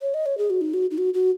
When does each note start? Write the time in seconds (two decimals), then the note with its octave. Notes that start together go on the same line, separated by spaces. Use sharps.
0.01 C#5
0.14 D#5
0.26 C#5
0.38 G#4
0.50 F#4
0.61 D#4
0.74 F#4
0.91 D#4
0.98 F#4
1.14 F#4